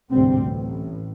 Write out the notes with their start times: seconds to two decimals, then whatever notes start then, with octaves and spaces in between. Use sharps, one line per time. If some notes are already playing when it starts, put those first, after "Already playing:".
0.11 A1 D2 G#2 C3 G3 C4
0.43 A1 A2